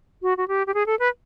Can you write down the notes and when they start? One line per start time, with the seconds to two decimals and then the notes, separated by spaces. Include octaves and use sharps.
0.22 F#4
0.37 F#4
0.48 G4
0.67 G4
0.74 G#4
0.86 A4
0.99 B4